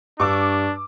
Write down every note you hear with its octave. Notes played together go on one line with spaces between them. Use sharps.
G2 D4 C#6 D6 E6